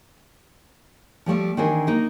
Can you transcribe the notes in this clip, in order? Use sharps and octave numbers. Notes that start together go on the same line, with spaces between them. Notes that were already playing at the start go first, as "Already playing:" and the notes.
F3 G3 A3 D5
D#3 E3 C4 D4 G#4 A#4
A#3 D#4